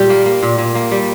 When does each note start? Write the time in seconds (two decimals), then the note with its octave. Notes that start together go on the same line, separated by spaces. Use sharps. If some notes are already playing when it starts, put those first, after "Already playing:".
Already playing: A#2 G3 G4
0.10 A#3
0.26 A#3
0.43 A#2
0.58 A#2
0.75 A#3
0.91 G3